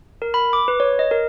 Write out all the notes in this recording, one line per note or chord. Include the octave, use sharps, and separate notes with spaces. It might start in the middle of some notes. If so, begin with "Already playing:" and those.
A#4
B5
D6
B4
C#5
D#5
A#4